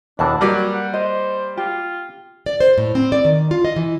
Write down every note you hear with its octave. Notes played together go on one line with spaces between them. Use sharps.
D#2 B2 E3 D4 D5 A5
F#3 G3 A#3 F#4 A#4 B4 D5
F#5
C5 D#5
F4 G4
D5
C5
A2
C4
D5
D#3
F4
D#5
E3